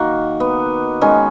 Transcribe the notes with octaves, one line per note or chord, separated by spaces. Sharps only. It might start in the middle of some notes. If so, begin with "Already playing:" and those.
Already playing: D#3 A#3 F#4
B3
D#3 G#3 C#4